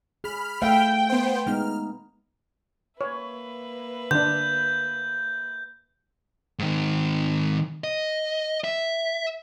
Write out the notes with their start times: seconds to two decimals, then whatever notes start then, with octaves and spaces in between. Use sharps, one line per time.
0.24 G#4 B5 F6
0.62 A3 E5 F5 G5
1.09 B3 C5
1.47 G#3 B3 D#4 F6
3.01 A#3 B4 C#5 E5
4.11 D3 D4 G6
6.59 G#2 D#3
7.84 D#5
8.64 E5